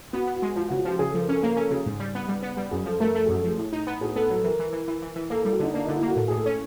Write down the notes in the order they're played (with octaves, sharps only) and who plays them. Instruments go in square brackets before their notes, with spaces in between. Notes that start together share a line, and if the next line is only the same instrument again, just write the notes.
[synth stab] B3 [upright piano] F#4
[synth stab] B3
[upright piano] F#4
[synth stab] G#3
[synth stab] F3 [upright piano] F4
[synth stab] C#3 [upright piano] F#4
[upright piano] F4
[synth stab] F3 [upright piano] G4
[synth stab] C#3 [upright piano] G#4
[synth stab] F3 [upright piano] A4
[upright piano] A#4
[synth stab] C#4 [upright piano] A4
[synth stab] A#3 [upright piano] A#4
[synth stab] C#4 [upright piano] A4
[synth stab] C#3 [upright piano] G#4
[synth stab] G#2
G3
B3
G3
B3
G3
[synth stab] F#2 [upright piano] G#4
[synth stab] F3 [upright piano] A4
[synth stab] A3 [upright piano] A#4
[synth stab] A3 [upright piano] A4
[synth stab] F#2 [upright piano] G#4
[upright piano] A4
[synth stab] F3 [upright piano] G#4
[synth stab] A2
D#4
B3
[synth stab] A2 [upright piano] G#4
[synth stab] B3 [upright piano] A4
[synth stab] F#3 [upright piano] A4
[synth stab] E3 [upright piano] A#4
[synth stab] E3
E3
E3
E3
E3
[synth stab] A#3 [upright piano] A4
[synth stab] G3 [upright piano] A4
[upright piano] G4
[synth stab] D3 [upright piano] D#4
[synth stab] A#3 [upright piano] D4
[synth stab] D3 [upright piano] D#4
[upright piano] E4
[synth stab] A#3 [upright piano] F#4
[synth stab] A2
[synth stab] A2 [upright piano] G#4
[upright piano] A4
[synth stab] C#4